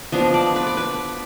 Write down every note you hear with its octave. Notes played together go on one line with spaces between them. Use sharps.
F3 B3 D4 D#5
D5
B4
D5
B4